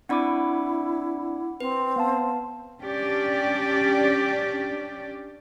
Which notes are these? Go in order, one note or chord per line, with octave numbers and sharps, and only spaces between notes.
C4 D4 E4 D5 F#5 B5 D6
C4 B4
B3 F5 A5
C#4 D4 G4 D5